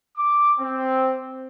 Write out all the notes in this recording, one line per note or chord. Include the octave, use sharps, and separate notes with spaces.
D6
C4